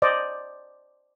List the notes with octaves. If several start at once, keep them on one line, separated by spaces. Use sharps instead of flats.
C5 D5 D#5